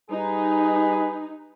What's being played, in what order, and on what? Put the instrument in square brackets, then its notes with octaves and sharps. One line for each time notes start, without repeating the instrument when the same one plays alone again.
[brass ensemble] G3 G#4 B4 [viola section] D#4